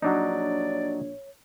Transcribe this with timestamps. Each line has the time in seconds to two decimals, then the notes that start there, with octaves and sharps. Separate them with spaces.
0.02 A#1 F#3 D4 D#4 C#5 D5